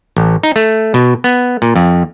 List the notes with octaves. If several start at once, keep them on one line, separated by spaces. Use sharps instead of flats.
A1
D#4
A3
B2
B3
A#2
F2